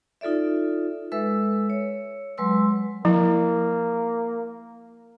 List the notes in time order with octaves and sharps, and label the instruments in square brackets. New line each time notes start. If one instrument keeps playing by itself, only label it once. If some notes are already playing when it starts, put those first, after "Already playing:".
[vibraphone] D#4 F4 A4 D5 E5
G#3 A4 B4 E5 E6
C#5
F#3 G#3 B4 C6 E6
[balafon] F3 [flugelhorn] A#3 [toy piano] E4